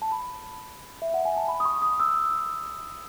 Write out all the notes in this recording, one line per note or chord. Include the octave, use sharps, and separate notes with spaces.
A5
B5
E5
F#5
G#5
A5
B5
D#6
C#6
D#6
E6